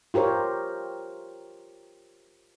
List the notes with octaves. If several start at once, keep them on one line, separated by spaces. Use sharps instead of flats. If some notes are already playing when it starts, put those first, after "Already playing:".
F4 G4 A#4 C5 C#5